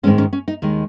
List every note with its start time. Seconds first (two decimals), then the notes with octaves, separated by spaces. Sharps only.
0.03 G#2 D#3 G#3 C4 C#4
0.18 C#4
0.33 C#4
0.48 D#4
0.62 D#2 D#3 G#3